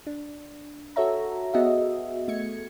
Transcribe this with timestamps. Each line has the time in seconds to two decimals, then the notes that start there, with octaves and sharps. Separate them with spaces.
0.07 D4
0.96 F#4 A4 C#5 E5 A#5
1.54 B3 F#4 G#4 D#5 E5
2.28 A3 G#6 C#7